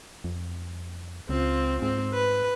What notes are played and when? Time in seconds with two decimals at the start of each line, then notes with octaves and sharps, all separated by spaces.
0.24 F2
1.29 C#2 C4 F4
1.82 G#2 C4
2.14 B4